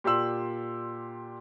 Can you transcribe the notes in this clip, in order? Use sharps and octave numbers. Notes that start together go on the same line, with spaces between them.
A#2 G4 D5 C6 E6 F#7